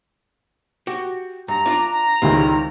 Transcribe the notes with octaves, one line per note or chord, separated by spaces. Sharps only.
F#4 G4
G2 A#5
D4 F4 D5
A#5
C#2 D#3 G3 C4 E4